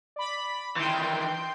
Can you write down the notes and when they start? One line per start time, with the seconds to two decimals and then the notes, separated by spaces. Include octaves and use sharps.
0.16 D5 B5
0.76 D#3 E3 G5 C6 G6